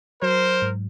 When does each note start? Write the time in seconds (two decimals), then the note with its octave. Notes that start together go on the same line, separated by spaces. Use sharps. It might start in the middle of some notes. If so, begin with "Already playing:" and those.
0.22 F#3 A#4 C5
0.62 G#2